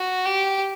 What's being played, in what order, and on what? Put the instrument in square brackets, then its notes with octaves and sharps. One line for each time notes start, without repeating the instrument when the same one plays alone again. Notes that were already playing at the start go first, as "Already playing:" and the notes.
Already playing: [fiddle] F#4
G4